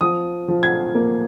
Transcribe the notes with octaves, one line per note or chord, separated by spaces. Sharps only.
F3 D#6
F3
G#6
A#3